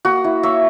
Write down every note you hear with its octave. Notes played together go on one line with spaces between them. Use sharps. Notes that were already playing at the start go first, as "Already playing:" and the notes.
A#3 F#4
E4
A#3 C#5 E5